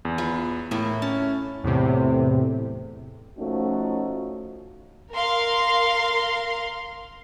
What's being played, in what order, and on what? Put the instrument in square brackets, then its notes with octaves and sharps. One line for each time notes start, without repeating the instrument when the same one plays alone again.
[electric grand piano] E2
[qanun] F4 B4 C#5
[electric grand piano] A2 [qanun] A3 A#3 E4
[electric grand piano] C#4 [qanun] A5
[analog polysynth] E2 A2 C3
[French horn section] F3 A3 C#4 D#4 F#4
[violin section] A#4 F5 C6